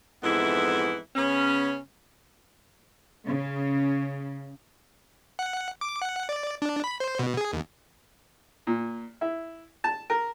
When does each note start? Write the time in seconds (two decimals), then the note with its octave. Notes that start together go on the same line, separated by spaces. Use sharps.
0.23 F2 G#2 E3 B3 E4
1.15 C#3 B3 C#4
3.26 C#3
5.39 F#5
5.81 D6
6.02 F#5
6.29 D5
6.62 D4
6.84 B5
7.00 C5
7.19 B2
7.37 G#4
7.53 D#2
8.67 A#2
9.21 E4
9.84 A5
10.10 A#4